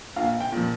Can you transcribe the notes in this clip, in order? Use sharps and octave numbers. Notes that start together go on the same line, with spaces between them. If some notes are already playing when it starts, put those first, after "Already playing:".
A#1 F5
G5
A#2 F3